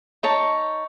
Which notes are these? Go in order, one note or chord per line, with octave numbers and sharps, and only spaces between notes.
D#4 C#5 A5